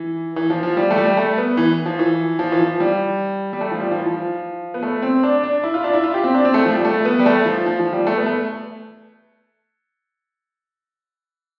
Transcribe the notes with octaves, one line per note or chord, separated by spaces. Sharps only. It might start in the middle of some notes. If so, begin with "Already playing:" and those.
Already playing: E3
E3
F3
F3
G3
A3
G3
A3
B3
E3
F3
E3
F3
E3
F3
G3
G3
A3
F3
G3
F3
E3
F3
B3
A3
C4
D4
D4
E4
F4
D4
E4
F4
G4
C4
D4
C4
A3
F3
G3
A3
B3
G3
A3
F3
F3
F3
G3
A3
B3
A3